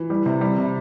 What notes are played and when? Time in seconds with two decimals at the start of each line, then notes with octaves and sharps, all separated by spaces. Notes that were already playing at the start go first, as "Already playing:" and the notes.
Already playing: E3
0.10 G3
0.26 C3
0.41 G3
0.58 C3